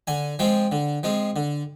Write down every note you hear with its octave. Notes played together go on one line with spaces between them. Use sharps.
D3 G#5
F3 G#3 C4 G5
D3
F3 G#3 C4
D3